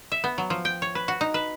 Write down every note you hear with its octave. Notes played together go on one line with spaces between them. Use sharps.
E5
B3
F#3
F3
G5
C#5
B4
F#4
D#4
B4